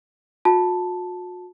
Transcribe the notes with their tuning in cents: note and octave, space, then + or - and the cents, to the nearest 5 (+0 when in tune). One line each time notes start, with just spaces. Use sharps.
F#4 -40 A5 +0